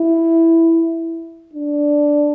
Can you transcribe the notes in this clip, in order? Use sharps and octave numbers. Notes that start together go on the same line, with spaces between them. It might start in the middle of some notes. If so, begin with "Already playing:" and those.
Already playing: E4
D4